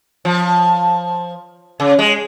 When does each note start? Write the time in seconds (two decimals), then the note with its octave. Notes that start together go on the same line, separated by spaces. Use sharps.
0.25 F3
1.80 C#3
1.99 G#3